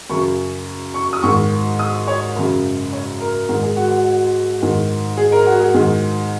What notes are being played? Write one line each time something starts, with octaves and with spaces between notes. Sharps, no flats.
F#2 C#3 C#6
C#6
D#6
G#2 D#3 C#6
D#6
C#5
F#2 C#3
C#5
A#4
G#2 D#3 A#4
G#4
F#4
F#4
G#2 D#3
G#4
A#4
F#4
G#4
G#2 D#3